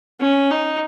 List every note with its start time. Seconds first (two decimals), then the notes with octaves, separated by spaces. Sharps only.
0.20 C#4
0.50 D#4